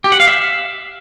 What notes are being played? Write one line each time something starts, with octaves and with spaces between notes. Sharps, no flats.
G4
F#5
F5
E5